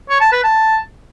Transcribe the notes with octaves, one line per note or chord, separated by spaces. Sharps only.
C#5
A5
B4
A5